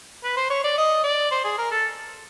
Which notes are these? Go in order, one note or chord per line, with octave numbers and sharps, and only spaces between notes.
B4
C5
C#5
D5
D#5
D5
C5
G#4
A#4
A4